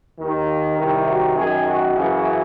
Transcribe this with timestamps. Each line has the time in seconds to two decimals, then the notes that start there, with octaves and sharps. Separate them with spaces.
0.18 D#2 D#3
0.77 C2 C3 D#3 E4
1.07 F#4
1.36 F#2 D#3 G#4
1.65 F#4
1.95 F#2 C#3 E3 F#4